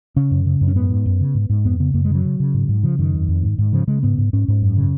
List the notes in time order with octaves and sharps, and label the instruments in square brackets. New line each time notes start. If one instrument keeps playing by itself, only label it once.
[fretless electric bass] C#3 C#4
F#2
C#3
F#2
C#4
G#2 B3
G#2
F#2
C#3
G#2
G#2
F2 B3
C#3 B3
F#2 A#3
G#3
C#3 F#3
C#3
C#3
G#2
G#2
C#3 F3
F#2 D#3
F2
F2
G#2
G#2
C#3 F3
C#3 G#3
G#2 B3
G#2
G#2 C#4
G#2
F#2
C#3